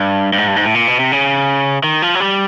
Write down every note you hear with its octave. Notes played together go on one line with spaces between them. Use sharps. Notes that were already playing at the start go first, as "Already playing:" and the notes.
Already playing: G2
G2
G#2
G2
G#2
A2
A#2
B2
C3
C#3
D#3
F3
F#3
G3